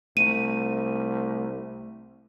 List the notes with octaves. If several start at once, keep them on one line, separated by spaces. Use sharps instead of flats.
C2 A3 D#7